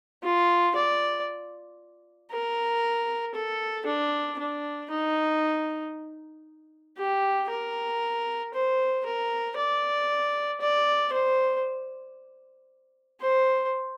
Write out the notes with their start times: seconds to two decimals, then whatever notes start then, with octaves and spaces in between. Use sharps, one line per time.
0.23 F4
0.75 D5
2.31 A#4
3.34 A4
3.86 D4
4.39 D4
4.90 D#4
6.98 G4
7.49 A#4
8.54 C5
9.06 A#4
9.57 D5
10.61 D5
11.12 C5
13.20 C5